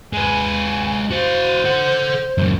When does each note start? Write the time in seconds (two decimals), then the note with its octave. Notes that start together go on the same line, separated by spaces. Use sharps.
0.13 G#3 B4 G#5
1.11 F#4 C5 F5
1.65 A4 F#5
2.38 C#2 F#2